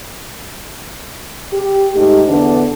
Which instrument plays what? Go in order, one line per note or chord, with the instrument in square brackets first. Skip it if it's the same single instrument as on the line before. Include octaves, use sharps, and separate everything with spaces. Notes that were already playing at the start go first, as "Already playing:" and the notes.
[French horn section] G4
G#2 A3 D#4 G4
E2 D3 B3 D4